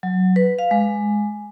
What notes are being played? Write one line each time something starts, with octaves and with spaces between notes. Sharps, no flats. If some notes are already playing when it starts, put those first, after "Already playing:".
F#3
B4
F5
G#3